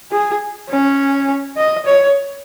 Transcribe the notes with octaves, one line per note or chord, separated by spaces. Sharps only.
G#4
C#4
D#5
C#5